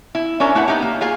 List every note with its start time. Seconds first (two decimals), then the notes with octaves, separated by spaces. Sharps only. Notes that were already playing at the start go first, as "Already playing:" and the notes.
0.15 E4
0.40 C#4 D4 A#4
0.55 A3 E4 B4 F#5
0.68 B3 D#4 G4
0.82 A#3
1.01 F4 G#4 F5